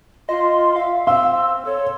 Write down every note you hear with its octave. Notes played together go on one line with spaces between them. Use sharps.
F4 D#5 C6
E5 F5
C4 F5 C6 E6
A4 C#5